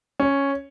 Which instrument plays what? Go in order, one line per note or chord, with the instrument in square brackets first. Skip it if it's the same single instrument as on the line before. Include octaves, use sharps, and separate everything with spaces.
[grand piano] C#4